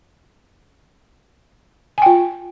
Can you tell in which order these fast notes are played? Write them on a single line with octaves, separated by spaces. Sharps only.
G#5 G5 F4